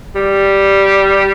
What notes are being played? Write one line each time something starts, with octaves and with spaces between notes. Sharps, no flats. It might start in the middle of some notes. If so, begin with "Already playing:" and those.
G3